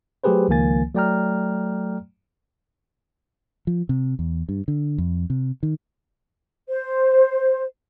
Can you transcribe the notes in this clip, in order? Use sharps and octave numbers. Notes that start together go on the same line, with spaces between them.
F#3 A3 G4 G#4 B4 C5
C#2 D#3 F3 A#3 G#5 A6
F#3 A3 D5 G5 A#5 F6
F3
C3
E2
G2
D3
F2
C3
D#3
C5